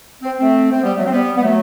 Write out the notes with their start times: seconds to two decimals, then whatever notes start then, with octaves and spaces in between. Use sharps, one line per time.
0.22 C4
0.39 A3 C4
0.71 C4
0.82 G3 B3
0.97 F#3 A3
1.06 C4
1.12 G3 B3
1.36 B3
1.43 F#3 A3